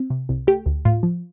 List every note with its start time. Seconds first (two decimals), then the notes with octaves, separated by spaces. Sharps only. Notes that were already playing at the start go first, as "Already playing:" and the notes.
Already playing: C4
0.10 C3
0.29 C2
0.47 A3 G4
0.66 D2
0.85 A2 F4
1.03 F3